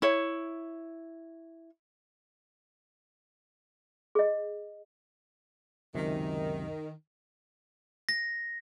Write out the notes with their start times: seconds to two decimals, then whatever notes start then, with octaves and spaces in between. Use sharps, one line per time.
0.02 E4 C#5
4.15 G#4 D#5
5.95 C#2 F#2 C3 D#3
8.09 A#6